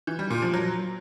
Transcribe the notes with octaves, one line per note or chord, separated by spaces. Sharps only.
E3
G3
A#2
F3
F#3